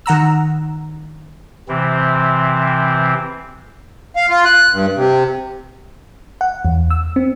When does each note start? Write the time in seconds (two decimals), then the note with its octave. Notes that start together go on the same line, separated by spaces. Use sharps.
0.06 D#3 F#5 A#5 E6
1.68 C3 E3 C4
4.16 F5
4.30 F4
4.45 F#6
4.72 G2
4.95 C3
6.41 F#5
6.65 E2
6.90 E6
7.16 C4